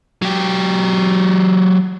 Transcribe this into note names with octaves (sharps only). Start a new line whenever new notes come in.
F#3 G4